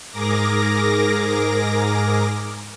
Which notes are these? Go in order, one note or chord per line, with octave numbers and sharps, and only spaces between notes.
G#2 G#4 A#4 D6 A#6